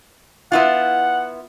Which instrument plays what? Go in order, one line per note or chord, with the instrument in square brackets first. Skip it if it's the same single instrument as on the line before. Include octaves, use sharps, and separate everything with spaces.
[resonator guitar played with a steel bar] B3 E4 F4 [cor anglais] F#5